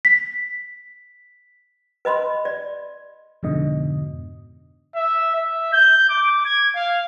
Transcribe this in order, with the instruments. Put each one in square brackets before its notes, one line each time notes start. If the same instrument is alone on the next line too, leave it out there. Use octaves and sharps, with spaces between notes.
[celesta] B6
[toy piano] B4 D#5 B5 C6
D5
[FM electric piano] F2 G#2 B2 D3 D#5
[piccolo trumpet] E5
E5
G6
D6
G#6
F5